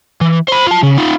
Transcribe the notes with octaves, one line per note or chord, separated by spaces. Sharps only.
E3
C5 B5
F4 A5
C#3
D#4 F4